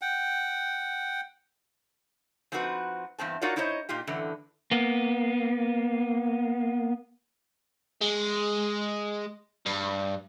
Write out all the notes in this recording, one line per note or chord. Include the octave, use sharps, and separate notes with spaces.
F#5 G5
F3 C4 D#4 F#4 B4
E2 G2 C4 A5
D#4 F4 F#4 A#4 C#5 D5
D#4 E4 C5 C#5 D#5
A#2 D#4 F4 G4
F#2 A2 D3 E3
A#3 B3
G#3
G2